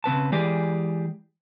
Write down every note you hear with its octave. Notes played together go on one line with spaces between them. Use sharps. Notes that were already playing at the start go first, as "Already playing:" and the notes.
C#3 C4 B4 A5
E3 G#3 G4 G#4 D5